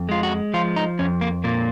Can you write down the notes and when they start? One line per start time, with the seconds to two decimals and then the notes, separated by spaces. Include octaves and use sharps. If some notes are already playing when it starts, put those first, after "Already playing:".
Already playing: F2
0.09 G#3 F4
0.23 F#4
0.54 F3 F4
0.76 D#4
0.99 F2 C#4
1.21 A#3
1.44 A#2 A#3